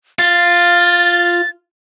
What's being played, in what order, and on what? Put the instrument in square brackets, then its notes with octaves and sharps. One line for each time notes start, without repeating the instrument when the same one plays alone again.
[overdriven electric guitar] F4 [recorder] A6